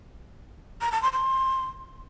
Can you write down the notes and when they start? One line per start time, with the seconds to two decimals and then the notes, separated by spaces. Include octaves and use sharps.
0.81 A#5
0.92 A5
1.02 C6
1.13 C6